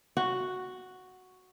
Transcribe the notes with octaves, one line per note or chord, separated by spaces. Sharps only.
F#4